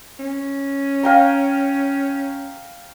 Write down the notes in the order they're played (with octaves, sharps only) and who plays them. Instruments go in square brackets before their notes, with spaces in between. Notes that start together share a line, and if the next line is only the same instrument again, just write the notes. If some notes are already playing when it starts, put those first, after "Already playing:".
[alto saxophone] C#4
[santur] F5 G5 A#5